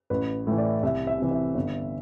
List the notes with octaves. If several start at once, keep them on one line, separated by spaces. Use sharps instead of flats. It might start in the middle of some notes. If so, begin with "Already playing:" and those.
A1 B4
A2 E3
D5
C2 E5
E5
C3 E3
E5
G1